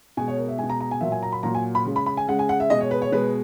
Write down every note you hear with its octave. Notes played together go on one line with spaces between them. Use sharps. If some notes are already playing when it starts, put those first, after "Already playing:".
B2 G#3 G#5
C#5
A#4
E5
B2 G#3 G#5
A#5
A#5
G#5
A#2 F#3 A#3 E5
G#5
A#5
B5
A#2 F#3 A#3 A#5
G#5
B5
C#3 G#3
B5
B5
G#5
C#3 G#3 F#5
G#5
F#5
E5
B2 G#3 D#5
C#5
B4
C#5
B2 G#3 B4